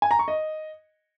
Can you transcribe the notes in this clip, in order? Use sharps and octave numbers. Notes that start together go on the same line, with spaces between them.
G#5
A#5
C#6
D#5